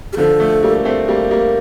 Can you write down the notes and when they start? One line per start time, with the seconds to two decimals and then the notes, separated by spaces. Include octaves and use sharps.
0.13 G4
0.17 D3 F3 A4
0.40 F3 A3
0.63 G3 A#3
0.85 A3 C4
1.08 G3 A#3
1.31 G3 A#3